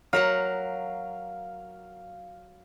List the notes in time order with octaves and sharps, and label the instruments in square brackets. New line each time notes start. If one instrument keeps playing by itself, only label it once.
[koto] F#3 A#4 F#5 [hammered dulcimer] F5